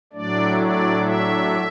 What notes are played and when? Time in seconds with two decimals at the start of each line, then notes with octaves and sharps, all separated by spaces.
0.13 A2 F#3 A3 D4 D5
0.58 D5
1.03 E5